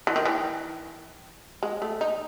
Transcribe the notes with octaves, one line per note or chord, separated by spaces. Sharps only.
E3
D#3
E3
G#3
A3
D#4